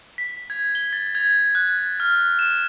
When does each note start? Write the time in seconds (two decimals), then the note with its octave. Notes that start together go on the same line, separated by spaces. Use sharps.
0.18 B6
0.50 G#6
0.75 G7
0.93 A6
1.15 G#6
1.55 F#6
2.00 F6
2.39 E7